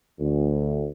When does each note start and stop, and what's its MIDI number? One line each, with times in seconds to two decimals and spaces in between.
0.20 0.89 38